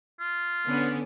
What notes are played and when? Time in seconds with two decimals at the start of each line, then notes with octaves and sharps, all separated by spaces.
0.20 F4
0.65 D3 B3 C#4